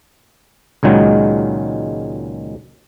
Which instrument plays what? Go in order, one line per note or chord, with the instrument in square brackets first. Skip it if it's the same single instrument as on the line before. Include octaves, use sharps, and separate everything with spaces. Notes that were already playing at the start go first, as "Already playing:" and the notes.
[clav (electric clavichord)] C#2 A#2 D#3 F#3 G#3